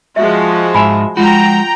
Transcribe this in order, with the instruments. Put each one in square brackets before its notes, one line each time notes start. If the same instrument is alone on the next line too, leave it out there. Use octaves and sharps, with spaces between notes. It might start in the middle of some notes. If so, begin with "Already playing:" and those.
[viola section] F3 G#3 F#4 [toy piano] E5
[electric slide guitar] G#2 F4 E5 [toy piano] G#5 B5
[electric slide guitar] F3 G#3 F#4 [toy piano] F4 [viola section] G5 A#5